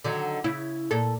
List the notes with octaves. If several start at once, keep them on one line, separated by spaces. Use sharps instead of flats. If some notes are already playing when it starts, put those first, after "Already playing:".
D3 D#3 F#3
C#3 E4
A#2 A4